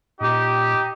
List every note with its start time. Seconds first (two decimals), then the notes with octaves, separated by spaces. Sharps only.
0.20 A#2 D#4 G4